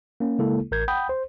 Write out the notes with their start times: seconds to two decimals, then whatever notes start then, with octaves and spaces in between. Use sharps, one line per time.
0.20 A#3 C#4
0.39 C#3 G#3 A#3 E4 A4
0.71 A1 A#4 G6 G#6
0.88 F#5 G5 B5 D#6 G6
1.09 C5